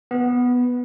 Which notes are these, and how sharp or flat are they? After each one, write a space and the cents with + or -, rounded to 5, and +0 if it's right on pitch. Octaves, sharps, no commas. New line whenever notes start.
B3 +0